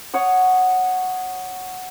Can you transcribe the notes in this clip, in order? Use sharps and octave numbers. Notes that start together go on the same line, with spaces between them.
C#5 F#5 D#6